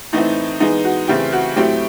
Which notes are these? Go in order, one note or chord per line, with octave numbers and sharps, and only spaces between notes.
A2 E3 A3 C4 D#4
E3 G#3 B3 D#4
F#4
C#3 E3 A3 C4 G4
F#4
A2 F#3 A3 C4 G4